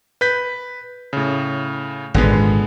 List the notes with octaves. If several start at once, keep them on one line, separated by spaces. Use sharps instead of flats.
B4 G6 B6
A2 C#3
G#1 A#2 D3 G#3 B3